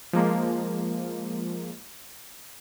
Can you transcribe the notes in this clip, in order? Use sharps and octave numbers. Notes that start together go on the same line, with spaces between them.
F3 G#3 A#3